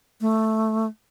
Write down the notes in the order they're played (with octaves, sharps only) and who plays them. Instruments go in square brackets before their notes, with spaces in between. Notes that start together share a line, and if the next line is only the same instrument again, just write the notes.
[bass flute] A3